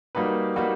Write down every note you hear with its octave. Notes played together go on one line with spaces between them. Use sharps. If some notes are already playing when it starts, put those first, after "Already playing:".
G3 A#3 D#4 F#4 B4
G3 A#3 D#4 F#4 B4